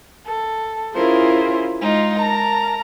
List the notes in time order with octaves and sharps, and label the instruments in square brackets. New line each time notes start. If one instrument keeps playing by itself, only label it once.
[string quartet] A4
C#4 E4 F4 G#4 A#4 C5
G#3 D#4 F4
A#4 A5 A#5